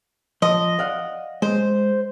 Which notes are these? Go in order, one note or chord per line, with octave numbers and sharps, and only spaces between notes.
F3 D#5 C6
D5 F5 F#5
G#3 C5